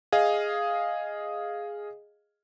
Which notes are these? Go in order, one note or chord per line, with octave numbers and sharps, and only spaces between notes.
G#4 D#5 F5